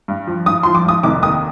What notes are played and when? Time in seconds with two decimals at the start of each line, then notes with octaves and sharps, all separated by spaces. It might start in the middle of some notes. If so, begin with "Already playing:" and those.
0.08 G2
0.27 F3
0.46 G2 D#6
0.63 F3 C6
0.75 D6
0.85 G2 D#6
1.03 F1 D6
1.23 D#2 D#6